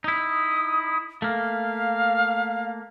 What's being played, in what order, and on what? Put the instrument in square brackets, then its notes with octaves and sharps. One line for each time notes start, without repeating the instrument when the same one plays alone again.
[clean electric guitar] D#4 E4 [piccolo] D#6
[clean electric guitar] A3 A#3 [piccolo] F5